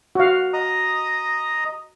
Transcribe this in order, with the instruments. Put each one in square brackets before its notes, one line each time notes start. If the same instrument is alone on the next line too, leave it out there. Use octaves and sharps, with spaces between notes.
[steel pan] F#4 F5
[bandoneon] D#5 A#5 D#6